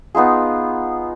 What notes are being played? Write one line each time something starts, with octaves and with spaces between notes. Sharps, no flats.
B3 D#4 F4 G#4